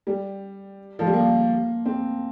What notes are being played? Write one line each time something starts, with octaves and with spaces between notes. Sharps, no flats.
G3
F3
G3
A#3
C4